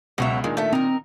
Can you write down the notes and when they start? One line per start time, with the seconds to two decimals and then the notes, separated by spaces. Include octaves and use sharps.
0.18 C#2 B2 F#3 E5
0.44 A#2 D#3 G#3 D4
0.57 A3 A4 E5
0.73 C4 D#4 A#4